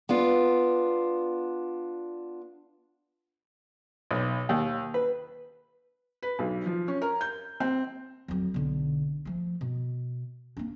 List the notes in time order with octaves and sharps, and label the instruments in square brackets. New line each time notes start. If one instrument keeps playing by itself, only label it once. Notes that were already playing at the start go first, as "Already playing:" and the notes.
[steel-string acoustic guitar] B3 D4 F4
[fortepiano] B1
D#2
B4
[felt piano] B4
B1
F3
C#4
A#4
G6
C4
[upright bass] F2 F#3
B1 D3
F3 A3
B2
A#3 D4